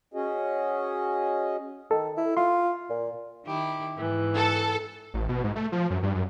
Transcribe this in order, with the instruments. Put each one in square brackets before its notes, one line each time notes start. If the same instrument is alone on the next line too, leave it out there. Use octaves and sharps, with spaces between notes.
[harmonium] C#4 F#4 G#4 D#5
[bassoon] D#3 [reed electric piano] A4
[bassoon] E4
[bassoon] F4 [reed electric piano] C6
[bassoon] A#2
[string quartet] D#3 E4 G4
G#2 E3
[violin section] A4 A5
[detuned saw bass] A1
B2
G#2
A3
F3
F#2
G2
F#2